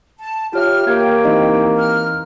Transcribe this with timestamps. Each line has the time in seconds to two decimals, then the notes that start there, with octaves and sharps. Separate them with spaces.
0.18 A5
0.53 F4 G4 C#5 E5 F6
0.87 A#3 G4 G5 G#6
1.25 E3 C4 D#4
1.78 F6